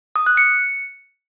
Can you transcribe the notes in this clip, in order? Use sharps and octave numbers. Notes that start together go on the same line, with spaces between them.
D#6
F#6
C#7